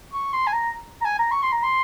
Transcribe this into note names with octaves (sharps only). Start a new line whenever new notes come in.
C#6
C6
G#5
A#5
A#5
G#5
A#5
C#6
C6
A#5
C6